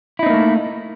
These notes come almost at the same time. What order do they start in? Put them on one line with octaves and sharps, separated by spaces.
E4 D#4 C4 A#3 A3